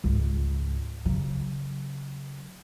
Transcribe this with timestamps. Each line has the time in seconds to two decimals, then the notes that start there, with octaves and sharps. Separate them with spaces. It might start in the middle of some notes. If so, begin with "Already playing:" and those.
0.04 C#2 G#2
1.05 C#3 F#3